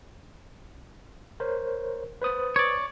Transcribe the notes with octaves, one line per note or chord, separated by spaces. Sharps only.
A#4 C5 C#5
B4 C5 D#6
C#5 D5